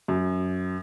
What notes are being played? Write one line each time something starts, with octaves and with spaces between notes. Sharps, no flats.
F#2